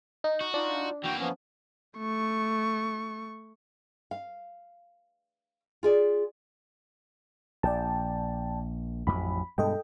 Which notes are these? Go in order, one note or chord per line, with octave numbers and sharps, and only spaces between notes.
D#4
F#4
D4 D#4 F4
E3 A#3 F#4 G5
F3 B3 C#4
A3 C#6
F5
F4 G#4 D5
A#1 D5 G5 A5
A1 F2 F#3 B5
G2 B2 G#3 A4 D#5 G5